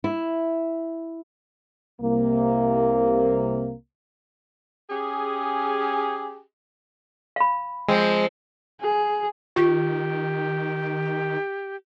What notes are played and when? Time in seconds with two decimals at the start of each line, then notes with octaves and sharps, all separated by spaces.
0.04 E4
2.01 C2 C3 A#3
4.90 C#4 G4 G#4
7.36 F5 B5
7.89 F3 G#3 C4
8.81 G#4
9.56 D#3 F4 G4